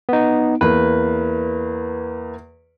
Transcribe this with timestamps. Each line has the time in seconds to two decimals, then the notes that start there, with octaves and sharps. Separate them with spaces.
0.09 B3 D#4
0.61 E2 A#3 B4